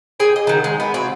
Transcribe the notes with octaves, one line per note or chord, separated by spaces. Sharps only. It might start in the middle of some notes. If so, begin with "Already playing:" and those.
G#4 G5 G#5
D#5
D#3 F#3
G#3
B3
C4 F#4